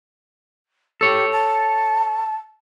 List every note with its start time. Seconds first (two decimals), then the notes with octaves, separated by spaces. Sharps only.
1.01 G4 A4 C#5
1.32 A5